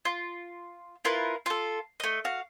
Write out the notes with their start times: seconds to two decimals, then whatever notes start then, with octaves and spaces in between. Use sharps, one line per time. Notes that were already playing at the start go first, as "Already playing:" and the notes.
0.05 F4
1.05 E4 F4 A#4 B4
1.46 F4 A4
2.00 A3 D#5
2.25 F#4 F5